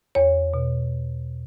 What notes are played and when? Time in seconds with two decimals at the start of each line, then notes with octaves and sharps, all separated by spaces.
0.15 E2 C#5
0.54 B2